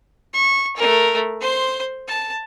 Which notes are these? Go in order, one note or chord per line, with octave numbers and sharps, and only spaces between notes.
C#6
A3 A#4
C5 C6
A5